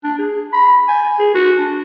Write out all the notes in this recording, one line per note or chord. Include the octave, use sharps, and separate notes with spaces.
D4
G#4
B5
G#5
G#4
F#4
D4